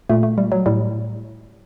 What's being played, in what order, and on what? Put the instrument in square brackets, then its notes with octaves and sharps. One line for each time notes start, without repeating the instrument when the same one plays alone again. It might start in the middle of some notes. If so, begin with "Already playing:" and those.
[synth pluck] A#2 A3
A3
G3
F#3
A2 G3